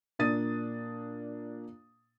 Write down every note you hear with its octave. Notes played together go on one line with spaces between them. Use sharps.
A#2 A#3 D4 D#6 A6 D#7